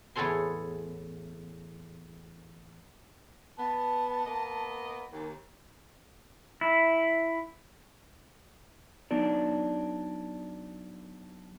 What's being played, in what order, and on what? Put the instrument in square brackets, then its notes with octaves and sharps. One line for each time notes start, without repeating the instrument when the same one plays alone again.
[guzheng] E2 A2 G#4 A4 C#5 C6
[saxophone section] B3 [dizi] A5
[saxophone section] A#3 B3 D#5
D#2
[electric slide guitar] E4
F#3 B3 D4 D#4 D5